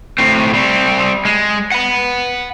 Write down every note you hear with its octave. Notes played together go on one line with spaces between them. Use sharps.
A2 C4
G3 C4
G#3
F#5 B5